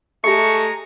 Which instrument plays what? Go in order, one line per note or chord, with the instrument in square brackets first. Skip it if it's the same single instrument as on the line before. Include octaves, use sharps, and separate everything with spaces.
[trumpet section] G#3 A#5 [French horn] A3 [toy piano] G4 G#4 E5 [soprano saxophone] C#6